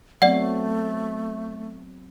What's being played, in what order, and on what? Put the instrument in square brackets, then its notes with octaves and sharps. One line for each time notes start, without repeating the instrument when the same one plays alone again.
[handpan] F#3 B3 C4 [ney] A3 [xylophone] D5 F#5